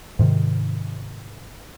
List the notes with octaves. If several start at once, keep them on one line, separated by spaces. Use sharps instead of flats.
G#2 C3 D#3